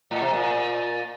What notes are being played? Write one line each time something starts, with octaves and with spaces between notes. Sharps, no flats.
A2
C3
A#2